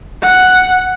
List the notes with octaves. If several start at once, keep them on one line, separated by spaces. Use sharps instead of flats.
F#5